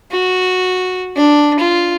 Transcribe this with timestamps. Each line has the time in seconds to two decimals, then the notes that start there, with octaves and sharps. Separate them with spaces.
0.11 F#4
1.16 D4
1.59 F4